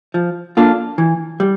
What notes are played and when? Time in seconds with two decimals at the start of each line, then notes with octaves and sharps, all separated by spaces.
0.14 F3
0.57 A#3 D4 F4 A4
0.98 E3
1.40 G3